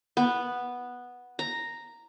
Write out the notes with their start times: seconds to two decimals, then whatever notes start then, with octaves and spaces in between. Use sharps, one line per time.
0.17 B3
1.39 A#5